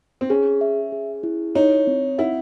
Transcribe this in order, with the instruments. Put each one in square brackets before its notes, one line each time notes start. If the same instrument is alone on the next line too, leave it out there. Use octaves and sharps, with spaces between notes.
[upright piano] C4
[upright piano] C#4 [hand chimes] G#4
[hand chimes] E5
G#4
E4
[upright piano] D#4 [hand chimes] C#5
[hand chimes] C4
[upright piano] E4 [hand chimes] F#5